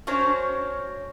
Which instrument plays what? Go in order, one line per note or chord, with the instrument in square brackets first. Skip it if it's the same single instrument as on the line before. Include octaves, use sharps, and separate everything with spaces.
[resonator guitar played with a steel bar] C#4 D4 F#4 C5 C#5